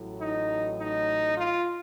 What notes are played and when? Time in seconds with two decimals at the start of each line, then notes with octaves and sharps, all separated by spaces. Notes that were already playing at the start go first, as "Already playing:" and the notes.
Already playing: A1 A2 F#3
0.20 D#4
0.79 D#4
1.36 F4